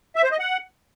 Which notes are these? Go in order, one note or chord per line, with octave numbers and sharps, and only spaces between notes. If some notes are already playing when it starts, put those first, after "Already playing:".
E5
C5
D#5
F#5